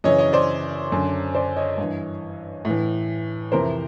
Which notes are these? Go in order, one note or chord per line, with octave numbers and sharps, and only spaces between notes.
F#2 C#3 E3 C#5 D#5
C#5 D#5
C5 D5
F#2 D3
C5 D5
C#5 D#5
G2
E3
A2
E3
F2 C3 E3 A#4 C5